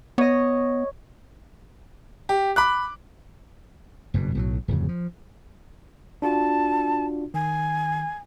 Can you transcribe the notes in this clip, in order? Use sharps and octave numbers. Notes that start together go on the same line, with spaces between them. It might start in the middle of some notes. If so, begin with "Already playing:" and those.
B3 C#5 D#5
G4
B5 D6 F#6
F#1 G2 B2
B1 A2 E3 F#3
D1 F2 C#3
F3
D4 F4 F#4 A5
D#3 G#5